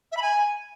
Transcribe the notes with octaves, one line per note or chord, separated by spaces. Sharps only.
E5
B5
G#5